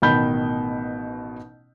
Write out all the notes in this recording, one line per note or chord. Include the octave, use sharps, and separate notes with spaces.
A1 B2 D#3 B5 G6